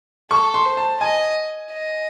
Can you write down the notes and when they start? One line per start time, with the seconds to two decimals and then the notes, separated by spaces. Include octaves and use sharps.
0.30 A4 C#6
0.54 C6
0.65 C5
0.77 A5
1.00 D#5 G#5
1.71 D#5